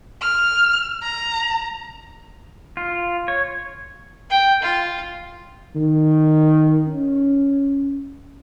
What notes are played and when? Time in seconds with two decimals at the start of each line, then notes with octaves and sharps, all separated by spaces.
0.21 F6
1.02 A#5
2.77 F4
3.28 C#5
4.30 G5
4.63 F4
5.76 D#3
6.87 C#4